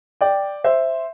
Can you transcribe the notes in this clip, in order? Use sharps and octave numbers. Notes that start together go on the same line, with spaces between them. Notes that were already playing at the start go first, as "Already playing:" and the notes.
D5 G5
C5 E5